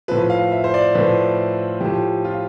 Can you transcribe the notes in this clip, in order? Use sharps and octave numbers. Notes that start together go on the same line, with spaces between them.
A2 F3 B4
F5
E5
C5
D5
A2 F3 B4
A2 F3 G4
F4